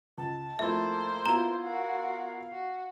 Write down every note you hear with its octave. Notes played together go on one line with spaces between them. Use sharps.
C#2 A5
F2 A3 A#3 E4 C5 E5
B3 E4 F4 A#5 G7
F#4 A#4 F5
F#4